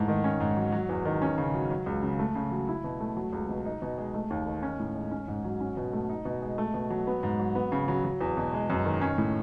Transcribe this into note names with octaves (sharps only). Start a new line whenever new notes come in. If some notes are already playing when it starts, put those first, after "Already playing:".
Already playing: G#2 E3 A3
D#3
C#4
G#2
F#3
F#3
E2
D#3
C#4
C#3
F#3
F#3
C#2
C#3
A3
C#3
F#3
E4
B2
A3
F#3
C#2
B2
D#4
B2
G#3
A3
D#2
D#3
C#4
A2
G#3
C#4
G#2
F#3
C#4
B2
A3
D#4
B2
G#3
A3
B2
F#3
B3
G#2
F#3
B3
C#3
F#3
F#3
E2
B2
G#3
F#2
D#3
C#4
A2